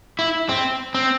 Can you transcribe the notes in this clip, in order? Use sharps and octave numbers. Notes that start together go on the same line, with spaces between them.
E4
C4
C4